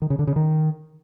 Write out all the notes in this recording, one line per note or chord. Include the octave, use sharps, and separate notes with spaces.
D#3
C#3
D3
C#3
D#3